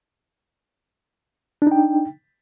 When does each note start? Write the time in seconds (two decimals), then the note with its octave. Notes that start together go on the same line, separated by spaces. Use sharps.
1.62 D4
1.67 D#4
1.71 G5